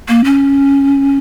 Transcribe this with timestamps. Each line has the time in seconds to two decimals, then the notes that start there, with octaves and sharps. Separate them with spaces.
0.09 A#3
0.24 C#4